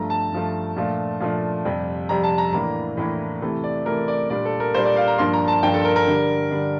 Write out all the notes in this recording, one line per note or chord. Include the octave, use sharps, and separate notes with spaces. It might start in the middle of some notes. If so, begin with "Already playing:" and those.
Already playing: G2 F3 A3 A#5
A5
G2 F3 A3
A#2 F3 A3 D4
A#2 F3 A3 D4
F2 C3 G3
F2 C3 G3 A#5
A5
A#5
A2 E3 A#3 D4 A#5
A2 E3 A#3 D4
C3 E3 A3
D5
C3 E3 A3 A#4
D5
A#2 G3 D4 D5
A4
A#4
A#2 G3 D4 C5
D5
F5
A#5
G2 F3 A#3 D4 C6
A#5
A5
G2 F3 A#3 D4 G5
A4
A#4
A#4
D3 G3 D4
D3 G3 D4